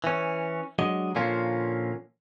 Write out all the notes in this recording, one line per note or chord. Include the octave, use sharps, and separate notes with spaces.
E3 C#4
F#3 G#3 D4 D#5
A#2 D3 F3 A#3 C#4 F4